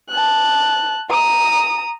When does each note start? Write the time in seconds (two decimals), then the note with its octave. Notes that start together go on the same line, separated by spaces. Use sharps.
0.10 A5 F#6
1.10 A#5 D#6